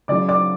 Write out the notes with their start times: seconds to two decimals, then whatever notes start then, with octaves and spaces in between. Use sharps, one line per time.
0.08 C#3 F#3 D5 D6
0.29 D5 D6